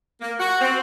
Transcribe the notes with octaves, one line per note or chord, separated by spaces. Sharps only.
A#3
F#4
C4